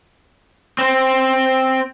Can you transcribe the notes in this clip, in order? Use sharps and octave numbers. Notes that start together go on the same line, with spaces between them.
C4 C5